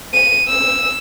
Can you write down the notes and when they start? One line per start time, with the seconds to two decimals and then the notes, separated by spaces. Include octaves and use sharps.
0.13 D#7
0.48 E6